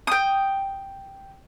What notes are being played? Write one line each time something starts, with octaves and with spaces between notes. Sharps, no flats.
G5 D#6